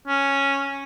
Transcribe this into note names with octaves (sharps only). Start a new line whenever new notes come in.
C#4